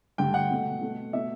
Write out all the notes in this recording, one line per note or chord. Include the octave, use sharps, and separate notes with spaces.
G2 D3 A3 G5
F#5
B2 A3
B2 A3
B2 A3 E5